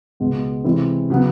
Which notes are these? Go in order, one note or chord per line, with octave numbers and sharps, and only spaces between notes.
C#2 B2 G#3 B3
C3 E3 G#3 C4 E4
C#3 F#3 B3